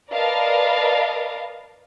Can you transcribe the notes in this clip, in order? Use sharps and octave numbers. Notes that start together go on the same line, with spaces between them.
A#4 B4 D5 D#5 F5 A5